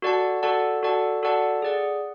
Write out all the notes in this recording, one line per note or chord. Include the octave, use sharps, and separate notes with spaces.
F#4 A4 D5 F#5 A5
F#4 A4 D5 F#5 A5
F#4 A4 D5 F#5 A5
F#4 A4 D5 F#5 A5
G#4 D5 F#5